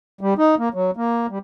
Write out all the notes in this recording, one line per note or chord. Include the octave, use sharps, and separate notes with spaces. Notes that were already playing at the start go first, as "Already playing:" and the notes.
G3
D#4
A#3
F#3
A#3
G3